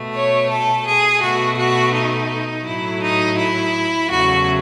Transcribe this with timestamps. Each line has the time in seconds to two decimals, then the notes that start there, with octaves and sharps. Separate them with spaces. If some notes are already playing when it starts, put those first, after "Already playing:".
Already playing: B2 A3
0.14 C#5
0.48 A4
0.85 G#4
1.21 B2 A3 F#4
1.57 F#4
1.93 D#4
2.65 A2 F#3 A3 E4
3.01 D#4
3.36 E4
4.08 E2 C#3 F#3 A3 F#4